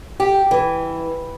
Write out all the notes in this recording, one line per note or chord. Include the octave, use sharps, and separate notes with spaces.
G4
E3